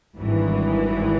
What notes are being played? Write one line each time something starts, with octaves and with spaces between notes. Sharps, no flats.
G#1 G2 E3